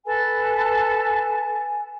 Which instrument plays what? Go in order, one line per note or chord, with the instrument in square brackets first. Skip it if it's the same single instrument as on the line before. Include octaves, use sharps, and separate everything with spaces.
[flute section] A4 B4 A5 [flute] G#5